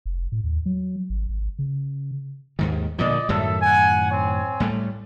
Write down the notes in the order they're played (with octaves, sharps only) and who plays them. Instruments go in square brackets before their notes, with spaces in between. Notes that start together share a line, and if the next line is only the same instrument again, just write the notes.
[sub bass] F1
A2
D#2
F#3
G#1
G#1
C#3
[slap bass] D#2 G#2 D#3
[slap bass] A#2 D3 F3 [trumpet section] D5 D#5
[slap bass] F#2 A2 D#3 [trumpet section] A4 E5
[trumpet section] F#5 G#5
C4 C#5 G#5
[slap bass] A2 G3 A3